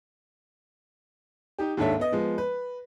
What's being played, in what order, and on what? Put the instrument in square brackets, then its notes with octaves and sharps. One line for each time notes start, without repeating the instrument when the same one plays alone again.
[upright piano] D#4 G4
D#2 G#2 D4 A4 C#5 E5
B3 D#5
F3 G#3 B3
B4